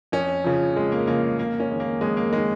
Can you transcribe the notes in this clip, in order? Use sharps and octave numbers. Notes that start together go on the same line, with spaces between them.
F2 C#4
C#3 F3
F2 G#3
A#3
C#3 F3 A#3
F2 A#3
C#4
D#3 G#3
A#3
F2 G#3
A#3
D#3 G#3